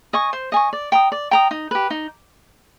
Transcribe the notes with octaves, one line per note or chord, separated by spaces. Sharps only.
D#5 G#5 C#6
C5
D#5 G#5 C#6
D5
G5 A#5 D#6
D5
G5 A#5 D#6
D#4
G4 B4
D#4